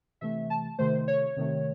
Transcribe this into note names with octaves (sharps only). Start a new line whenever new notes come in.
C3 E3 A3 E5
A5
C3 D#3 A3 C5
C#5
C3 D#3 A3